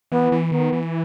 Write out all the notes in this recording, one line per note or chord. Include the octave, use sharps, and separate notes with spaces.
E3 B3
E3
D#3 B3
E3